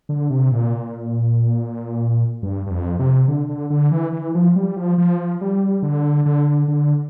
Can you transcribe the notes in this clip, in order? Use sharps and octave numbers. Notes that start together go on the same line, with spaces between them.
D3
C3
A#2
G2
G2
F2
C3
D3
D3
D3
E3
E3
F3
G3
F3
F3
G3
D3
D3
D3